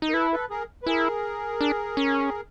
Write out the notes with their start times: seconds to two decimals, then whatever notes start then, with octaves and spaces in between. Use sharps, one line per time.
0.02 D#4
0.09 A#4
0.13 E4 A4 B4
0.32 A4 B4
0.50 G#4 A#4
0.83 B4
0.86 E4 G#4 A#4
1.61 D4
1.97 C#4